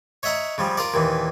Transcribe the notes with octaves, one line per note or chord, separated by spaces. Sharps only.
C#5 D#5 E5 F#5 A#5
C#3 F3 G3
F4 A#4 D5
D#2 A#2 E3